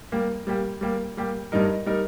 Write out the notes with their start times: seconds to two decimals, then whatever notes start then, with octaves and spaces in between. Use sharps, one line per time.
0.12 G3 A#3 G4
0.47 G3 A#3 G4
0.81 G3 A#3 G4
1.17 G3 A#3 G4
1.52 G2 G3 D#4 A#4
1.86 G3 D#4 A#4